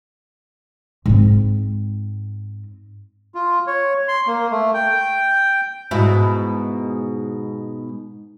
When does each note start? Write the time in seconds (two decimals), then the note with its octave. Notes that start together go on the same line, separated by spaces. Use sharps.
1.06 G#2 C4
3.35 F4
3.67 C#5
4.08 C6
4.27 A#3
4.51 A3
4.74 G5
5.91 G#2 B2 E4